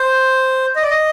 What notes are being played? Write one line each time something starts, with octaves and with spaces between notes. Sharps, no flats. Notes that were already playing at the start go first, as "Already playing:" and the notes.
Already playing: C5
D#5
D5
D#5